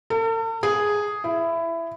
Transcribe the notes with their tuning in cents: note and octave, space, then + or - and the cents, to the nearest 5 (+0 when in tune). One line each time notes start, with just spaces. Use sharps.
A4 +45
G#4 +0
E4 +15